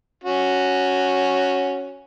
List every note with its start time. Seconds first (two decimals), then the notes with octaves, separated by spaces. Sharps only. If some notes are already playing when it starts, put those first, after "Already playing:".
0.24 C#4 F#4